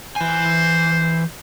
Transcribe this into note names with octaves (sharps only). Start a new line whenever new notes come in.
E3 C5 G#5